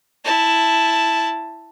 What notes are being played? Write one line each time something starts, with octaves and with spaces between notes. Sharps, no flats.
E4 A5